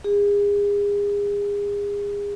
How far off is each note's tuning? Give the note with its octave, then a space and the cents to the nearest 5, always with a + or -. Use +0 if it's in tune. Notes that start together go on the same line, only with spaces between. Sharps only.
G#4 -35